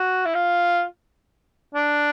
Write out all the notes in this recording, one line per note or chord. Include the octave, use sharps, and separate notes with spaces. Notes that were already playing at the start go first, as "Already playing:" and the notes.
Already playing: F#4
E4
F4
D4